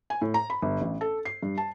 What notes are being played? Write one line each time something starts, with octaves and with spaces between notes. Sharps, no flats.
G#5
A2
A#5
B5
G1
A1
A4
C7
G2
A5